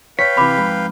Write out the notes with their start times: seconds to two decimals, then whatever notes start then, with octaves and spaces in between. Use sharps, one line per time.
0.19 B4 C#5 F5 G5 B6
0.37 C3 E3 B5 D6
0.57 F2 G#2